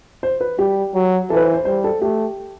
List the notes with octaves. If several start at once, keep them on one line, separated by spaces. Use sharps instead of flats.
C5
B4
G3 G4
F#3
E3 A4
B4
C5
C5
G3 C5
A4
A3 G4